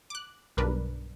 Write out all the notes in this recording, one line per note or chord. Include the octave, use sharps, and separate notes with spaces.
D6 F#6
B1 G2 D4 A#4 B4